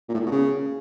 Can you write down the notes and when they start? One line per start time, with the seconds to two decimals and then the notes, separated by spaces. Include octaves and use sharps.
0.08 A#2
0.14 A2
0.20 A#2
0.26 B2
0.31 C#3